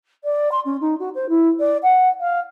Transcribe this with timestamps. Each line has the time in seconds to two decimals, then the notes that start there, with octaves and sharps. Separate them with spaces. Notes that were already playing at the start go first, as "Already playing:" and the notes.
0.24 D5
0.51 C6
0.65 C#4
0.80 D#4
0.99 F#4
1.14 C5
1.29 E4
1.59 D5
1.83 F#5
2.20 F5